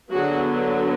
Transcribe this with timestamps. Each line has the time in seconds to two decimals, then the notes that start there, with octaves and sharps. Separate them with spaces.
0.12 D3 F#3 B3 F#4 G#4